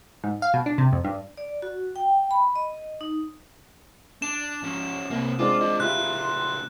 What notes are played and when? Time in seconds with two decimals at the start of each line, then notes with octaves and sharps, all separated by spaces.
0.24 G#2
0.42 F5
0.54 B2
0.66 D4
0.78 C3
0.93 F2
1.05 G2
1.37 D5
1.62 F#4
1.96 G5
2.31 B5
2.56 D#5
3.01 D#4
4.22 D4 E7
4.64 F3 C#4
5.11 C2 A#3 C4
5.39 G#3 C4 D4 F4 D6
5.61 F4 D#5
5.80 C#3 A3 E4 F4 G4 C6 F#6